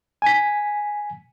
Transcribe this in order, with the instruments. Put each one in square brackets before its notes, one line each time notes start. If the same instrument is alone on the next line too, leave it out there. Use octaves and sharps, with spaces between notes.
[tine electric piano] G#5 B6